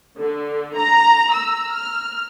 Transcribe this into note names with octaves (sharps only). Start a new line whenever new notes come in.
D3
A#5
E6
F6